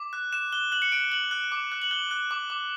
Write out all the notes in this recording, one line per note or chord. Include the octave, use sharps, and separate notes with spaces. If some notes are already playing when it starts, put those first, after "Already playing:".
Already playing: D6
F#6
F#6 E7
F#6 G7
F#6 F#7
C#7
F#6 D7
F#6 F#7
F#6
D6
F#6
F#7
F#6 G7
F#6
D6
D6